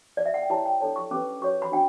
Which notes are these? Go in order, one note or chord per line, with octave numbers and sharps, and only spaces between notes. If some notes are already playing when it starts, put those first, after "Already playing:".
D5
E5
F#5
G5
E4 G4 C#5 A5
G5
D4 A4 C#5 A5
C#6
C#4 G4 B4 D6
F#4 C#5 C#6
B5
D4 F#4 G5